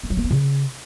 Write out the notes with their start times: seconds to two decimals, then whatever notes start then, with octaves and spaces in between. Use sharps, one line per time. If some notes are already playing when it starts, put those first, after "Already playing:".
0.03 C4
0.10 F#3
0.17 A#3
0.24 B3
0.31 C#3